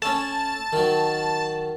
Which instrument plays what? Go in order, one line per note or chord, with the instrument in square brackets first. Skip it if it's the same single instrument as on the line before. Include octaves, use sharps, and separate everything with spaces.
[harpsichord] A3 C#4 [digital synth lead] A5
[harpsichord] D#3 F#3